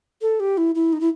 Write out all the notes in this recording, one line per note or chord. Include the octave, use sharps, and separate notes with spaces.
A4
G4
E4
E4
D#4
E4